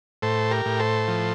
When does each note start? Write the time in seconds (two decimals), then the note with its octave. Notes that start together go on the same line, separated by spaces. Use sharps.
0.22 A2 A4 C5
0.51 G4 A#4
0.65 A2
0.79 A4 C5
1.08 F3